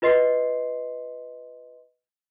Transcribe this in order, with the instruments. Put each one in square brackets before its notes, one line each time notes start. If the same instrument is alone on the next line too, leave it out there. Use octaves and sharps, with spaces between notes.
[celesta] F4 B4 D#5 C6 C7